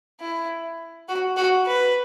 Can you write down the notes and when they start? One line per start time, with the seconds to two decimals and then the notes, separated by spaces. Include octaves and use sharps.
0.21 E4
1.09 F#4
1.37 F#4
1.67 B4